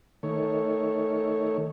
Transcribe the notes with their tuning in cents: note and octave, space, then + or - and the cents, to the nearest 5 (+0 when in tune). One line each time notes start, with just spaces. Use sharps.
D#3 +15 A3 +5 C#5 +0